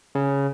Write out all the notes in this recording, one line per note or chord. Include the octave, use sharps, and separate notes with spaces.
C#3